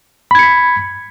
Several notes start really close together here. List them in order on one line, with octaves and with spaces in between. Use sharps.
B5 G#6 C#7 B6